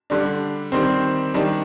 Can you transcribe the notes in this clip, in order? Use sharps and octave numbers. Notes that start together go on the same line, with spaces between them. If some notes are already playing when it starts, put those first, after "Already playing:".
D3 G3 D4
D#3 G3 C4
D#3 G3 D4